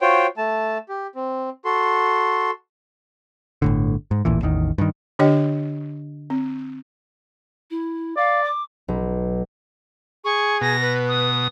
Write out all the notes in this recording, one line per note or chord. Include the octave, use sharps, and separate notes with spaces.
F4 F#4 C5 C#5 G5
A3 A5
G4
C4
F#4 A4 C6
G1 A2 D3
G#2
D1 A1 A#2 E3
A1 E2 D#3
G2 D#3
D3 D4 G4 C#5 D#5 G5
C4
E4
D5 F5
D6
B1
G#4 C#6
B2 A#6
B4
D#6